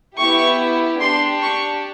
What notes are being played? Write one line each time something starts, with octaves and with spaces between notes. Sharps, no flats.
B3 E4 G4 C#6
D4 G4 C6
C#6